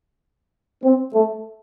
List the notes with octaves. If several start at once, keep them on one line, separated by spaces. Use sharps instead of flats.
C4
A3